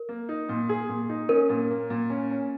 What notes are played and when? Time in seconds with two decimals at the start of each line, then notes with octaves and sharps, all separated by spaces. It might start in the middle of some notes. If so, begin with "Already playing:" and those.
Already playing: A#4
0.09 A#3
0.29 D#4
0.49 A#2
0.69 G#4
0.89 A#2
1.09 D#4
1.29 C#4 A#4
1.49 A#2
1.70 A#3
1.90 A#2
2.10 C#4
2.31 C#4